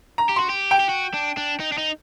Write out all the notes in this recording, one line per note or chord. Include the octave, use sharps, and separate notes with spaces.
A#5
G4
F#4 C6
G4
G5
G4
F#4
D4
D4
D#4
D4
D#4